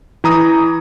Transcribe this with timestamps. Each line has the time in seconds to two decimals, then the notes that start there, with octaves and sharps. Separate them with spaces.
0.24 E3 A#5 D#6